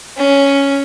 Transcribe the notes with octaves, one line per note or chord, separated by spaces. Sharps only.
C#4